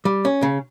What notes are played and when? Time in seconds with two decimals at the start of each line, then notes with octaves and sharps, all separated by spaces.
0.05 G3
0.25 C#4
0.43 C#3